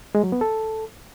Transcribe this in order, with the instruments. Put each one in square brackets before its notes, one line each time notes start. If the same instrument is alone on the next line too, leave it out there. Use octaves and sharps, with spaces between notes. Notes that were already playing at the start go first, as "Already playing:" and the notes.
[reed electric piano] G#3
F#3
B3
A4